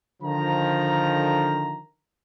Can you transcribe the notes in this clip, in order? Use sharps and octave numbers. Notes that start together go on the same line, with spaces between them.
D3 D#3 F3 A#5